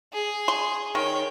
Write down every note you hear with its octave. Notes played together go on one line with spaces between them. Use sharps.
G#4
C6
D#3 C#5 G5